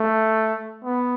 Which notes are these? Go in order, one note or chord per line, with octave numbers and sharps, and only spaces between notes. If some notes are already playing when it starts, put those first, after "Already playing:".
Already playing: A3
B3